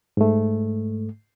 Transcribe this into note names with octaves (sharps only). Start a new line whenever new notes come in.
G#2 A3